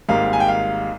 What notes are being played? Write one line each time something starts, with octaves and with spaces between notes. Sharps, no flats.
G#1 G#2 G3 A#3 F5
G#5
G5
F5